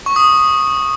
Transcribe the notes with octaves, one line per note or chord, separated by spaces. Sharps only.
C#6
D#6